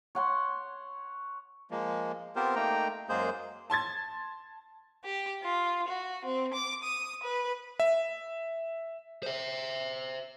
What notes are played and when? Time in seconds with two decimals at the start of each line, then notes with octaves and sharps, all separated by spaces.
0.15 C#5 F#5 C6
1.71 F3 G#3 A#3
2.36 B3 C4 F4 G4 A#4 C5
2.55 A3 A#3 D#4 G5 A#5
3.09 F#2 G#3 A#3 G#4 C5 G6
3.70 A5 C6 G#6 A6
5.03 G4
5.43 F4
5.87 F#4
6.25 C4
6.53 D6
6.83 D#6
7.23 B4
7.80 E5
9.23 C5 E5